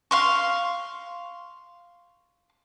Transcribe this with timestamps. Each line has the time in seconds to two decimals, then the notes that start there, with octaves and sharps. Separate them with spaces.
0.11 F5 C6 C#6